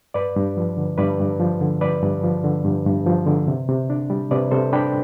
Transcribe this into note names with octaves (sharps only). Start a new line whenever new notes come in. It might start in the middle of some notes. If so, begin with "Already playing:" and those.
G2 B4 D5
G2
F3
D3
G2 B4 D5
G2
F3
D3
G2 B4 D5
G2
F3
D3
G2
G2
F3
D3
C3
C3
D4
G3
C3 B4 D5
C3 A4 C5
D4 G5 B5